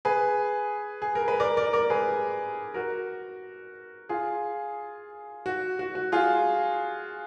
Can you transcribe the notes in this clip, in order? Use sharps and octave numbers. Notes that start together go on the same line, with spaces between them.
G#4 B4
G#4
A#4
B4
A#4 D5
A#4 D5
A#4 D5
G#4 B4
F#4 A#4
F4 G#4
F#4
F#4
F#4
F4 G#4